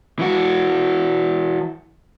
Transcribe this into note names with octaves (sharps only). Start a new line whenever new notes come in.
E3 F#4